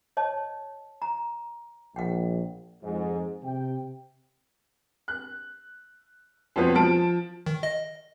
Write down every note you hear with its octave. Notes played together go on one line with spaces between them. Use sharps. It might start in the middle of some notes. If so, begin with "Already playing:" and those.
C#5 D#5 A5
A#5
A#1 F#5 G5
F2 G#2 G#3
C3 G5
F#6
F2 B2 B3 C4
F3 A5 D7
D#3
D#5